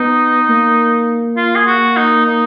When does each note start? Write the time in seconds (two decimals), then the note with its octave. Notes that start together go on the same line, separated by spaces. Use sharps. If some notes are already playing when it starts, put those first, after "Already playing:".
Already playing: B3 D#4
0.49 A#3
1.37 F4
1.55 G#4
1.67 F#4
1.97 D#4
2.25 D#4